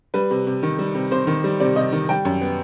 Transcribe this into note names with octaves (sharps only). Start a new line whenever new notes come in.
G3 B4
C3
C3
D#3
G3
C3
C3 C5
D#3
G3
C3 D5
C3 D#5
D#3
G3 G5
F#2
B3